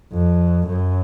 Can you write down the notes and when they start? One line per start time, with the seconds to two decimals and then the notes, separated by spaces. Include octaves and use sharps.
0.13 F2
0.68 F#2